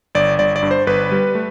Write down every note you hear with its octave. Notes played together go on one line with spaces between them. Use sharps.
G1 D5
G1 D5
D5
G2
C5
G1 B4
G3
A3